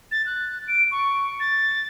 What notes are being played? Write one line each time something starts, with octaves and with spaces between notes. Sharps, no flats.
A6
F#6
D7
C#6
A6